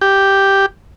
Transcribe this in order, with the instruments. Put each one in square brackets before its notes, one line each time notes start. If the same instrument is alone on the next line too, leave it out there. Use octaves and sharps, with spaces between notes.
[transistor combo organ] G4